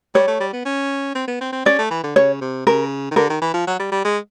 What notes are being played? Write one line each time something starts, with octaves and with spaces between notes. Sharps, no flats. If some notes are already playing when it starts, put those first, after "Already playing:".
G3 C#5
A3
G3
B3
C#4
C4
B3
C4
C4
C#4 D5
A3
E3
D3
C#3 C#5
C3
C#3 A#4
D#3
D3 A#4
D#3
E3
F3
F#3
G3
G3
G#3